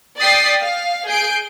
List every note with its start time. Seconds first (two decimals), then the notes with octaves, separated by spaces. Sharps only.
0.18 D5 G5 D#6 A6 B6 C7
0.63 F5
1.09 G#4 G6 C7 D7